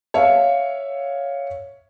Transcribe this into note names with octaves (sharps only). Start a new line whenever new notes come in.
C#5 E5 F5